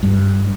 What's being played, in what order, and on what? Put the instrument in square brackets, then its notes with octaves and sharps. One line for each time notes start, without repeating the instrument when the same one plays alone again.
[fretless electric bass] G2